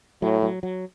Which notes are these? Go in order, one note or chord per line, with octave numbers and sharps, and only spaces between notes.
A2 F#3
F#3
F#3